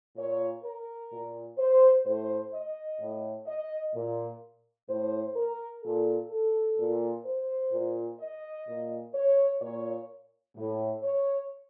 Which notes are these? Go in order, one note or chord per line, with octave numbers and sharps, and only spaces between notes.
A#2 C#5
A#4
A#2
C5
A2 C5
D#5
A2
D#5
A#2
A2 C5
A#4
A#2 A4
A4
A#2
C5
A#2
D#5
A#2
C#5
A#2 C#5
A2
C#5